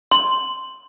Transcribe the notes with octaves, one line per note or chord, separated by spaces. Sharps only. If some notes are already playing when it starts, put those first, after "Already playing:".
C6